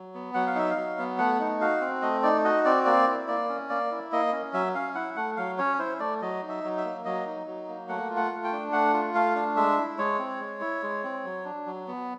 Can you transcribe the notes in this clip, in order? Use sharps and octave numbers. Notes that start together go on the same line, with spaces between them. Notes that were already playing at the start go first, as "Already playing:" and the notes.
Already playing: F#3
B3
F#3 F#5
F5
D#4 E5
F5
F#3
B3
A3 F#5
D#4
F#4 F5
C4
A3 D#5
D#4 D5
F#4 D#5
C4 D5
A#3 D5
E4
A#3 D5
C#4
A#3 D5
E4
A#3 D#5
C#4
F#3 E5
C#4 F5
E4 F#5
A3 F#5
F#3 F5
C#4 C#5
E4 C5
A3 D5
F#3 D#5
D#4
E5
F#3
E5
A#3
F#3 D#5
D#4
F#3
A#3
A3 F#5
F4
F#5
A3
G5
D4
A3 F#5
F4
A3 F5
D4
G#3 E5
E4
G#3 C#5
C4
G#3
E4
G#3
C4
F#3
D4
F#3
B3